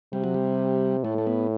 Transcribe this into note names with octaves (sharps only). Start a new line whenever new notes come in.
C3 G3
F#3
G3
A2 A3
A3
B3